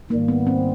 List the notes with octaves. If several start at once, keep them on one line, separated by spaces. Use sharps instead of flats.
G#2 D#3 G3 A#3
B3
C4